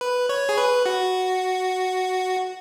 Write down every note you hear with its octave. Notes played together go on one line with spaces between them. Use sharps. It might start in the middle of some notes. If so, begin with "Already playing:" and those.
B4
C#5
G#4
B4
F#4